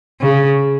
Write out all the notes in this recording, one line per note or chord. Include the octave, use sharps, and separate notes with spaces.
C#3